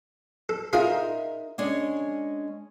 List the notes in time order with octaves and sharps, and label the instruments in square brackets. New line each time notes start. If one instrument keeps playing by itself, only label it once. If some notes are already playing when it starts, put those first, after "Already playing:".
[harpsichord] A4
[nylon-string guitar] D#4 A#4 E5 [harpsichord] F4 G#4 B5
[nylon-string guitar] G#3 C#4 D4